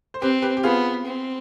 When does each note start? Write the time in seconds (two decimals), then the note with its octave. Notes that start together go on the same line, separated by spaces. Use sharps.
0.14 C5
0.22 C4 G4 B4
0.42 G4 B4
0.57 G4
0.63 B3 F4 G#4
1.06 C4